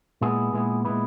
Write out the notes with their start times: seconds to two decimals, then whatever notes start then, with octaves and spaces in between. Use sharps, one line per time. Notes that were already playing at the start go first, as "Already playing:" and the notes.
0.21 A#2 G#3 B3 E4 G#4
0.53 A#2 G#3 B3 E4
0.85 A#2 G#3 B3 E4 B4